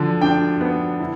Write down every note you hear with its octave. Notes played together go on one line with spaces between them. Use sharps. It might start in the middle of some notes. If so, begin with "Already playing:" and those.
Already playing: D3 F3
D4 G5
B3
E4